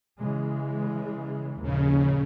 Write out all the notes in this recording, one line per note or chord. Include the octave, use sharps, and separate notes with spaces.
C#3 E3 G#3
A#1 D#2 C#3